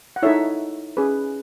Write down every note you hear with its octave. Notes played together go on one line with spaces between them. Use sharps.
F#5
D#4 E4 A4 C#5 E5
C#4 G#4 B4